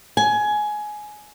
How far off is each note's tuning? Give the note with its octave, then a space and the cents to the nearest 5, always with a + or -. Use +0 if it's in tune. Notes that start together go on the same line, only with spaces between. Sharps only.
G#5 +15